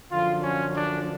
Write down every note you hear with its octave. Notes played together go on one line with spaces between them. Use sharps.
F#2 D3 F3 F4
C#4
D4